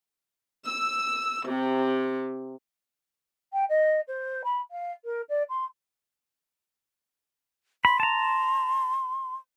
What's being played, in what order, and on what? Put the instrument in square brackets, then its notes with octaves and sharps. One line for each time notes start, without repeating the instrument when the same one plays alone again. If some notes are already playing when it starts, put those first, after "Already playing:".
[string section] E6
C3
[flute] G5
D#5
C5
B5
F5
A#4
D5
C6
[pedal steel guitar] B5 [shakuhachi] C6
[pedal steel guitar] A5 A#5